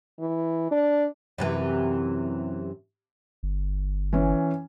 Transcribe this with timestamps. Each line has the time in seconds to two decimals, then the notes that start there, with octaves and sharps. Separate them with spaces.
0.20 E3
0.71 D4
1.38 F#2 C3 E3
3.43 G1
4.13 E3 C#4